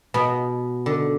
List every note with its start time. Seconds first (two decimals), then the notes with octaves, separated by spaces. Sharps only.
0.14 B2
0.86 D3